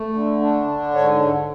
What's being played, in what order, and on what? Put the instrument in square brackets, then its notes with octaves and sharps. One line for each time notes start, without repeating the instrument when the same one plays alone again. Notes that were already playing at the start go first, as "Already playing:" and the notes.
Already playing: [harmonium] A3
D3
D4
D3
G#2 C#5